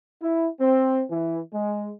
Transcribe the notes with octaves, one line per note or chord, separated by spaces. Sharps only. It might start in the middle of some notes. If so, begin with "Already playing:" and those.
E4
C4
E3
G#3